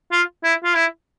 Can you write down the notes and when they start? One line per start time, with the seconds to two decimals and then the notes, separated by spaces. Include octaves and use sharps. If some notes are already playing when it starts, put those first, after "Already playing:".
0.12 F4
0.44 E4
0.64 F4
0.75 E4